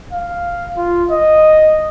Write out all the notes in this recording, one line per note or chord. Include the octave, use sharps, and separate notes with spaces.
F5
F4
D#5